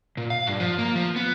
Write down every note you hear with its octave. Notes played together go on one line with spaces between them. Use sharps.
A#2
F5
G2
F3
A#3
F3
B3